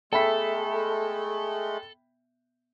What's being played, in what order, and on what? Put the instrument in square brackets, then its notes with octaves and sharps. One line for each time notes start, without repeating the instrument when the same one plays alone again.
[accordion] G#3 A3 [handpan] B3 E5 [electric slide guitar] A4 [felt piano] G5 B5 B6